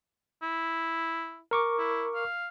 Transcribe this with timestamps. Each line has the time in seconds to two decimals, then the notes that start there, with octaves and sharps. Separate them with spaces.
0.42 E4
1.51 A#4 C#6 D6
1.78 E4
2.15 F5